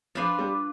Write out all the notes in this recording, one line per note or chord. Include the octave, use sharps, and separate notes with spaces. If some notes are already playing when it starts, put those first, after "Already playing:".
F3 D4 F4 B4 D5
G3